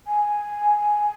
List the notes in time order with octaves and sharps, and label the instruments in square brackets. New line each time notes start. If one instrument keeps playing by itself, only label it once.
[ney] G#5